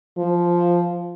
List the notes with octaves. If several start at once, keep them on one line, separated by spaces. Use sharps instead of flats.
F3